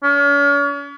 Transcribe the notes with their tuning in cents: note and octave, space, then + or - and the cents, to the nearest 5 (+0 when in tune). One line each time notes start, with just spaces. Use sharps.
C#4 +40